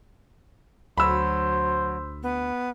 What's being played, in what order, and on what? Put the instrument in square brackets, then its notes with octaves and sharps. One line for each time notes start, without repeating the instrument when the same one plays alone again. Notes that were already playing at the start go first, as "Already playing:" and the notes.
[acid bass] D2 [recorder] F#3 [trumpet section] C5 [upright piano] B5 E6
[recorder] B3